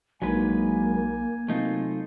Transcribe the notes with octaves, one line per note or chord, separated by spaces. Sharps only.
A#1 F#3 G#3 A#3 D4 D#4 B4 G#5
C3 F#3 A3 C4 D#4 F4